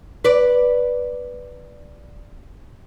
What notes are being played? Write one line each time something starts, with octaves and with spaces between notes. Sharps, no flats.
B4 D5